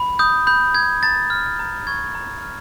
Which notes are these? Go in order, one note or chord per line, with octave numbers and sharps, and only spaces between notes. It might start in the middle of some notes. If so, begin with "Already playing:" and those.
Already playing: B5
D#6 G6
B5 G6
G6 G#6
A#5 A6
F6
A#5
C#6 G#6
A#5
F6